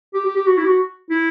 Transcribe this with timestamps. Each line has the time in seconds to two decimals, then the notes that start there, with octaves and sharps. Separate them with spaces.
0.14 G4
0.25 G4
0.36 G4
0.46 F#4
0.57 E4
0.64 G4
0.67 F#4
1.10 E4